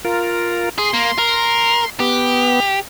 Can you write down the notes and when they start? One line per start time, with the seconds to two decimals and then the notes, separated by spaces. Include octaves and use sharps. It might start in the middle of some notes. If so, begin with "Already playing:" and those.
0.05 F4 A#4
0.78 G#4 C6
0.94 A#3
1.18 A#4
2.00 B3 G4